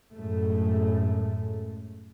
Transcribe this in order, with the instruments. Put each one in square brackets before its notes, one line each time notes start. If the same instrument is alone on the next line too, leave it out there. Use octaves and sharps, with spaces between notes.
[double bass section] F#2 A2 G#3 A3